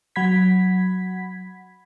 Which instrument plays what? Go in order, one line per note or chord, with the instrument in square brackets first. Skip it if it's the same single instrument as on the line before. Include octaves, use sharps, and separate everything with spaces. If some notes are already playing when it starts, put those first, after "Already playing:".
[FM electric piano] F#3 F#5 B5 G#6 B6